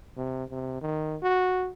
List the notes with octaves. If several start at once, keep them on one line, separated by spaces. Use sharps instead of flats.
C3
C3
D#3
F#4